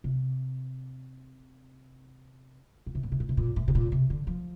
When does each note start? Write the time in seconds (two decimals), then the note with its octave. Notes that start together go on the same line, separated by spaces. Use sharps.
0.04 C3
2.86 A#2
2.95 C3
3.03 A#2
3.12 C3
3.20 A#2
3.29 C3
3.37 A#2
3.56 A2
3.68 C3
3.75 A#2
3.92 C3
4.10 D3
4.27 F3